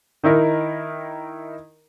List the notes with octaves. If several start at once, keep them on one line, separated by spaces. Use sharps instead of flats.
D#3 D#4 E4 A#4